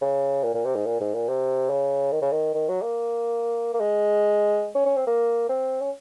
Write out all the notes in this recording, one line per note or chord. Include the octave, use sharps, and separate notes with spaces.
C#3
A#2
A#2
C3
G#2
A#2
G#2
A#2
C3
C#3
D#3
C#3
D#3
D#3
F#3
A#3
A#3
G#3
C#4
C#4
C4
A#3
C4
C#4